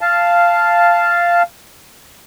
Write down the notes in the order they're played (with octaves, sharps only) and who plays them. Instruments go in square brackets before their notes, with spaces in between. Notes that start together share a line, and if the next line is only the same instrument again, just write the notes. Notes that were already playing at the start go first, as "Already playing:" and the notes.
[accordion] F5 A5